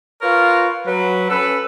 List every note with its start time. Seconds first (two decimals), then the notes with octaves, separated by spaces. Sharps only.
0.22 F4 A#4 B4 C#5
0.86 F#3 B4
1.30 C#4 A4 B4